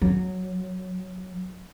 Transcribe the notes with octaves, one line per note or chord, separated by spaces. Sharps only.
F#3